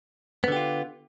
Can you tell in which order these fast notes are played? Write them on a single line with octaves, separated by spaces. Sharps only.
B3 D3 G4 F4